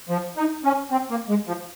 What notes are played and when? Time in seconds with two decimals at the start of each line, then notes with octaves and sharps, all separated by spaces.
0.09 F3
0.37 D#4
0.64 C#4
0.92 C4
1.10 A#3
1.29 G#3
1.47 F3